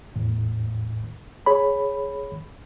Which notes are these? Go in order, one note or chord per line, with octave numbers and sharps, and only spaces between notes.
E2 A2
G#4 C#5 B5